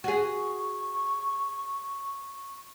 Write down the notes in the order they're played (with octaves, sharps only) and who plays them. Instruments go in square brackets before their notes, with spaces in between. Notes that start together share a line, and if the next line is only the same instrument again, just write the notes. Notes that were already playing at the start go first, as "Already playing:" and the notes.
[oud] F#4 G#4 [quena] C#6